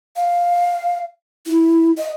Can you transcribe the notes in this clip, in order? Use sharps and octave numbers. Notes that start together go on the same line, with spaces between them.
F5
E4
D#5